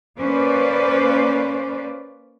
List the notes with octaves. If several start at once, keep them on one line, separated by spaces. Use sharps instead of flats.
A#3 C#4 B4 C5 D5